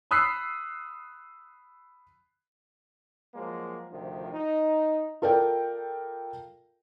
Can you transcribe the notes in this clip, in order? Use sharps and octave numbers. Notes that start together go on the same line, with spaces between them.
B5 D#6 E6 F#6 B6 C7
F3 F#3 G#3 A#3
D2 C3 D#3 F3
D#4
F4 A4 A#4 D5 G5